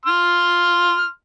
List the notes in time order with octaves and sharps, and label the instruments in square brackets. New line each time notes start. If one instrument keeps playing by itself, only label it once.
[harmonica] C6 F6